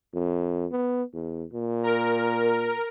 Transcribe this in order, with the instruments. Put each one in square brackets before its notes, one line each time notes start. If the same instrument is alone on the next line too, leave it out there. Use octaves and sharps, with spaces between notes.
[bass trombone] F2
B3
E2
A#2
[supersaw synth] A#4